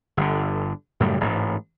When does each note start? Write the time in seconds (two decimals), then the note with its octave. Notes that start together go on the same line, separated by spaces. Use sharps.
0.17 G1 D3
1.00 F#2 A2 C#3 G3
1.21 A1 G#2